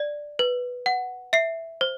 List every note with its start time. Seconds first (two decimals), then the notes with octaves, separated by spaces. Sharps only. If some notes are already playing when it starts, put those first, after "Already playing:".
Already playing: D5
0.39 B4
0.86 F#5
1.33 E5 C7
1.81 C5